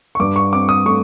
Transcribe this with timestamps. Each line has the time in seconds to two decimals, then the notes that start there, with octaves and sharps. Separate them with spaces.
0.15 C#6
0.20 G2 D6
0.36 C#6
0.53 C4 D6
0.69 D#6
0.86 A3 C#6